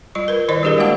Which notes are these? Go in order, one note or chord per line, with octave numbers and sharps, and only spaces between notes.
G3 F4 C#6
A#4 B4
D#3 E4 C5 D5 D#5
G3 D4 G4 G#4 A#4
G3 G#3 A#3 F#4 F#5 A5